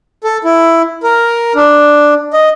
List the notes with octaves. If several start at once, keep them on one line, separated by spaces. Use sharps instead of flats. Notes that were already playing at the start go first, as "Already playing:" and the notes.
A4
E4
A#4
D4
D#5